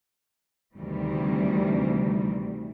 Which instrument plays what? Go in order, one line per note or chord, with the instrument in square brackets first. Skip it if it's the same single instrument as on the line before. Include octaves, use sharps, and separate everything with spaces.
[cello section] D2 C3 D#3 E3 G3